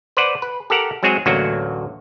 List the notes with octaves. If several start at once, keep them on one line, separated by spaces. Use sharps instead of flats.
B4 C5 D5 F#5
B4
G4 A4 A#4 F#5
F#3 G#3 C4 F#4 G#4
A1 D2 F#3 A#3 F#4